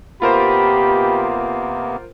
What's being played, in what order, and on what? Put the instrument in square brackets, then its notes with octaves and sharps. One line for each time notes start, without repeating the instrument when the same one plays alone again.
[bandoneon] C3 A#3 B3 [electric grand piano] F4 A#4 C5 [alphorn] G4 [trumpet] B5